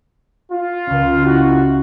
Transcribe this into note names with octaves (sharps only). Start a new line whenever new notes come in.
F4
C#2 C#4
E4 F#4